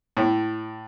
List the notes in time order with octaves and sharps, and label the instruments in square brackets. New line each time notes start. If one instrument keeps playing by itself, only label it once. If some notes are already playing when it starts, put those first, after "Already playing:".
[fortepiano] A2